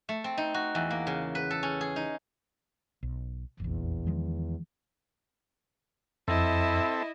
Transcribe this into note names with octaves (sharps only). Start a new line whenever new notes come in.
A3
C4
D#4
F#4
E2
A#3
C#3
B4
A4
C#4
G#4
D#4
B1
F1 A#1 E2
D#3 F3 G#3
F2 C4 E4 A4 D#5 E5